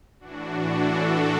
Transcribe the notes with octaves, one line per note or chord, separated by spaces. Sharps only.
A2 E3 D4 F#4
F#4 A4